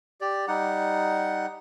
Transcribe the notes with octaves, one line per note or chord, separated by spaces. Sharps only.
G4 D5
G3 D#4 F#5